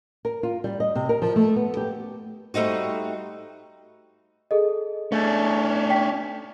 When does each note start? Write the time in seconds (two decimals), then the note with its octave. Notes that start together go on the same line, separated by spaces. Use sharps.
0.25 A#4
0.43 F4
0.64 G3
0.80 D#5
0.95 C3
1.09 A#4
1.22 F3
1.36 A3
1.56 B3
1.77 G4
2.54 G3 A3 C4 D#4 F#4
4.51 G#4 A4 D#5
5.12 A3 C#4 D4
5.90 G5 B6